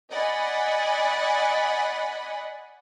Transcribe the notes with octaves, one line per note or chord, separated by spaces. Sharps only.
D5 D#5 F#5 G#5 B5